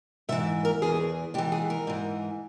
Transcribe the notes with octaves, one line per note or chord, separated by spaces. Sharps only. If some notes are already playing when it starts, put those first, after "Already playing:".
G#2 E3 E5
A#4
E2 E3 G#4
G#2 E3 G4
G#4
A#4
G#2 E3